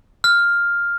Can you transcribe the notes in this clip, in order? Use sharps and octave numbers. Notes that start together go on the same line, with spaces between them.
F6